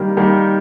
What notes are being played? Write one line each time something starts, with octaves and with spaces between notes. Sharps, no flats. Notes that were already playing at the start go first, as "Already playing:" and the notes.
Already playing: D#3 G3 A#3
D#3 G3 A#3